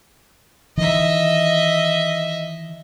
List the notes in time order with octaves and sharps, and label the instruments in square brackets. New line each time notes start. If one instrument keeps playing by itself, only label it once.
[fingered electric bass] D#3 E3 [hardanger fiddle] D#5 E5